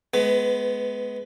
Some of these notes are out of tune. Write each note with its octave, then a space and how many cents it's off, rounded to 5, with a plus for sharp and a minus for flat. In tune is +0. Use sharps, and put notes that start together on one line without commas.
G#3 +35 B3 +10 B4 +30